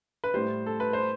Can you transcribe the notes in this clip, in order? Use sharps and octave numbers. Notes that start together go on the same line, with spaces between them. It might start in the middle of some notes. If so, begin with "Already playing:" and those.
B4
A2 G3 C5
A4
B4
C5